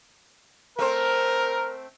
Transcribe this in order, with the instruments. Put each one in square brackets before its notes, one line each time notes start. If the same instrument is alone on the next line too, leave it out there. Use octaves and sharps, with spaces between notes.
[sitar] A3 C4 C5 [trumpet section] A#4